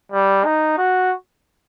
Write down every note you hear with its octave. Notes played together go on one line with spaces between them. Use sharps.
G3
D#4
F#4